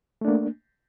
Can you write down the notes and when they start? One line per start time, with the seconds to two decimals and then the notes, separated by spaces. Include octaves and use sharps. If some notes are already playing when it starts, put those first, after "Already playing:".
0.21 A3
0.25 D4
0.28 A#3